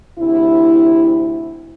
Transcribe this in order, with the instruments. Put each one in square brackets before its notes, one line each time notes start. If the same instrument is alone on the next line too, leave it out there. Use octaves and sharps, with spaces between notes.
[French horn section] D2 C3 E4